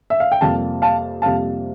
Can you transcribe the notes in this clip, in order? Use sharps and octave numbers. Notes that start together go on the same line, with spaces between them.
E5
F5
G5
F2 C3 G3 A#3 F5 A5
F5 A5
F2 C3 G3 A#3 F5 A5